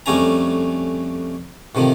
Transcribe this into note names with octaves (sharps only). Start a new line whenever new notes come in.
F2 G3 A3 C#4 G#5 A#5
A2 C3 D#3 F3